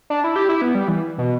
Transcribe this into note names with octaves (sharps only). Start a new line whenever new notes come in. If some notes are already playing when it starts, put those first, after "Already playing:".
D4
E4
G4
E4
B3
G3
E3
B2